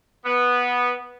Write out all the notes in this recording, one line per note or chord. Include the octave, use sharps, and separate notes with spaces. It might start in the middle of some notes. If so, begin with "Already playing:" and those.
B3